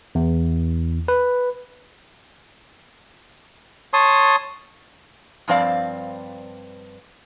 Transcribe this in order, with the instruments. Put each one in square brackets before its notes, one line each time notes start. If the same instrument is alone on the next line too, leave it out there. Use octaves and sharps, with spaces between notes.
[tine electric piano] E2
B4
[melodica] C#5 A5 C6 D#6
[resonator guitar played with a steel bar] G2 F3 C4 D5 F5